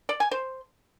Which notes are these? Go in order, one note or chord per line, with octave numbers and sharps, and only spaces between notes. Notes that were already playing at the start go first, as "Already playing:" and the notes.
D5
G#5
C5